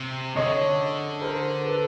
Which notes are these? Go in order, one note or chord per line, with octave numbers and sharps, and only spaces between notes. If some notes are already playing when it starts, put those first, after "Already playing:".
Already playing: C3
D3 C#5 D#5
A#4 C5
A4 B4